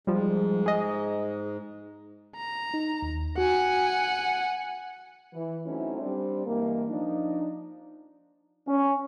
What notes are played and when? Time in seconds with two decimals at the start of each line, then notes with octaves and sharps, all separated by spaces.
0.07 G#2 F3 G3
0.66 G#4 D#5
2.37 A#5
2.74 D#4
3.02 D#2
3.38 F#4 F#5 G#5
5.34 E3
5.66 F#3 A3 C4 C#4 D#4 E4
6.00 G3 C4 D4
6.46 G2 E3 G#3 A#3
6.89 F3 D4 D#4
8.68 C#4